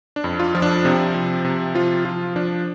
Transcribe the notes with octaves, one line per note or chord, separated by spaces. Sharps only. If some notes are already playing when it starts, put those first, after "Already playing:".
D4
F2
F4
F3
D4
C3 C4
F3
C3
F3 F4
F3 F4
F3 D4